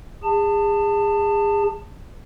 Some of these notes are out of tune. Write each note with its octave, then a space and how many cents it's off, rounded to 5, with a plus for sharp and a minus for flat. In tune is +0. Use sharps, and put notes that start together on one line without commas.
G#4 -30 A5 +20